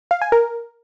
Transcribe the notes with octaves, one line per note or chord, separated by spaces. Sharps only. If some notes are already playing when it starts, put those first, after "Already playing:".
F5
G#5
A#4